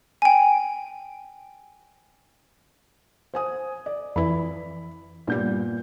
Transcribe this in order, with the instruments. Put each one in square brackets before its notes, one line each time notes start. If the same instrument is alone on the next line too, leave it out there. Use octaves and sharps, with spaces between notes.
[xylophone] G5 G#5
[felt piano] C5 G#5 D#6
D5
[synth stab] F2 E3 [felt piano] B5
[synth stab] G2 G3 [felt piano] A#2 B3 G6